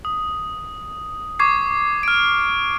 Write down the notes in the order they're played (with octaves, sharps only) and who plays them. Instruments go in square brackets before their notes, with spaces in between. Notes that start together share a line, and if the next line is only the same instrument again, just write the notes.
[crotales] D#6
C#6 D6 G#6 C7
F6 D7